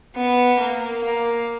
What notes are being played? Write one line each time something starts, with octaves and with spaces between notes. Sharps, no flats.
B3
A#3
A#3